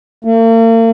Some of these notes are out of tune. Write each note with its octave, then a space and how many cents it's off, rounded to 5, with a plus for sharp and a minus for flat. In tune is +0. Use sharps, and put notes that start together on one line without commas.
A#3 -45